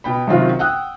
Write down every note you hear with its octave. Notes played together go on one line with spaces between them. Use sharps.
B2 G5 B5
F#2 C3 D#3 C4 F4 F#4
F#5 G5 D#6 E6 F#6